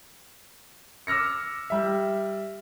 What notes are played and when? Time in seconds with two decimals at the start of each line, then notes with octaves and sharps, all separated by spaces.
1.07 D6 E6 F6 A#6 C#7
1.70 G3 E5